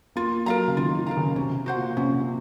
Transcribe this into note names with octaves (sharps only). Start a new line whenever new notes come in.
A#3 F4
F#3 A#4 F5 A#5
C#3
D#3 F4
D#3
A#4 F5 A#5
C#3
C3 C#4
F#4 C5 F#5
A#2
C3 C#4